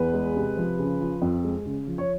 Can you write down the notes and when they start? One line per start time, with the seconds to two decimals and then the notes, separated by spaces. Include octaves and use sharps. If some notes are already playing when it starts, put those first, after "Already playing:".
Already playing: E2 B4
0.14 G#3
0.36 C3
0.57 F3
0.79 C#3
1.00 F3
1.22 F2
1.44 G#3
1.65 C#3
1.87 F3
1.98 C#5